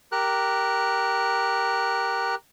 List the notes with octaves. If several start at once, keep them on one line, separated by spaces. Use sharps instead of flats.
G4 A#4 F#6